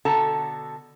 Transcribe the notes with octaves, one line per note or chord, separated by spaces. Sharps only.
B2 D3 F#4 A4 A5 A#5